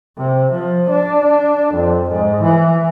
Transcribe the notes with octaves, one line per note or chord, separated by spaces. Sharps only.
C3
F3
D4
F2
G#2
E3